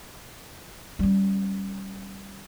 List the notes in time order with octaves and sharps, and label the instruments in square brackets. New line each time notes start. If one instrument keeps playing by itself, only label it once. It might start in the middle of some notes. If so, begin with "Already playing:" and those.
[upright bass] G3 C#4